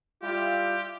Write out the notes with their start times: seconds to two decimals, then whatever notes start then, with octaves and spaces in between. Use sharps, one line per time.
0.23 G3 E4 F4 G4